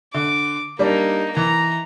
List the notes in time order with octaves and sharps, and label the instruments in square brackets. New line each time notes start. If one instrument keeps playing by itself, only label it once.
[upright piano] D3 [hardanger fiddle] D6
[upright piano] G3 D4 [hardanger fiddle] A#3 D#4
[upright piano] E3 [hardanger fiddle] A#5